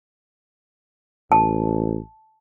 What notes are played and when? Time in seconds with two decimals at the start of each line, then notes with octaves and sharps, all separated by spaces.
1.32 A1 A5